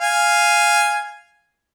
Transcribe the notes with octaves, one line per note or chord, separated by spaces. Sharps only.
F5 G#5